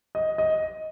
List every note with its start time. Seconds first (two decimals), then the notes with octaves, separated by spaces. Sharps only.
0.15 D#5
0.38 D#5